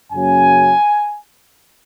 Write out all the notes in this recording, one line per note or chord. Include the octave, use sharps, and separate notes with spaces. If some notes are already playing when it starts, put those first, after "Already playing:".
F#2 C#3 F#3 A#3 C#4 G#5